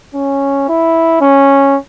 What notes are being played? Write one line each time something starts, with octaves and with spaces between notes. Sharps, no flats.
C#4
E4
C#4